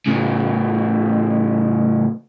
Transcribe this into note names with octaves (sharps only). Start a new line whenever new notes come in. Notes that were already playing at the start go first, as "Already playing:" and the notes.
A2 C#3